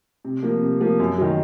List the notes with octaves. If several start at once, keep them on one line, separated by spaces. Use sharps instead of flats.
C3
F3 A#3
C3
F3 A#3
F#2
D#3 F#3